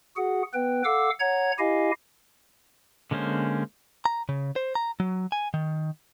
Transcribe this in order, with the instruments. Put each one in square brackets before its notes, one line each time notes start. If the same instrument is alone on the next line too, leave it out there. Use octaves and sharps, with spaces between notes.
[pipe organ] F#4 G#4 F#5
B3 B4 G5
A4 F5 F#5 D6 E6
C#5 F#5 A#5 G#6
E4 G4 D#5 F5 G#5
[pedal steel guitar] D3 G#3 A#3 C#4 C5
[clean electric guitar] A#5
C#3
C5
A#5
F#3
G#5
D#3